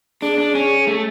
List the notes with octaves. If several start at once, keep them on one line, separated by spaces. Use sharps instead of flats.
D4 G#4
D4
C#4
A3